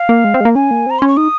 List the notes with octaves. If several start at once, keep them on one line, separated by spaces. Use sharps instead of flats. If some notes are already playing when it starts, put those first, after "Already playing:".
Already playing: F5
A#3
G#3
C4
G#3
A#3
C#4 G#5
A#3
C4 A#5
C#4 C6
C#6
D#4 D#6